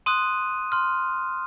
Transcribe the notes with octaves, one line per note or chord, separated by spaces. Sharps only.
C6 D#6 F#6 D#7
C6 F6